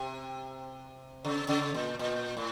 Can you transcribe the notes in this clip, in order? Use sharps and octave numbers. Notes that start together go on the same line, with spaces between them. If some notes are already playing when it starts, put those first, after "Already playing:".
Already playing: C3
C#3
C#3
A#2
A#2
A2